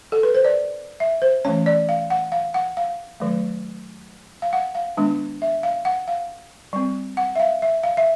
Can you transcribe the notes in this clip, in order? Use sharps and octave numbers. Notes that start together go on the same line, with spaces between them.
A4
B4
C5
D5
E5
C5
E3 A3 C#4 C#5
D5
F5
F#5
F5
F#5
F5
D#3 F#3 A3
F5
F#5
F5
D#3 G#3 B3 D4
E5
F5
F#5
F5
G3 C4
F#5
E5
F5
E5
F5
E5